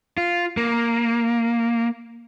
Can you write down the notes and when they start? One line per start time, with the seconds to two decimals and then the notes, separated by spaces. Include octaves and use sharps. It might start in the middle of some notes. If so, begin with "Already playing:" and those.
0.18 F4
0.57 A#3